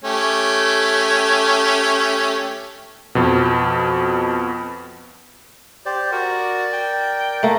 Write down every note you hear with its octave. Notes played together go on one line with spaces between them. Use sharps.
A3 C#4 G4
F2 B2
G4 C5 D5
F#4 A#4 D5
G5
A3 A#3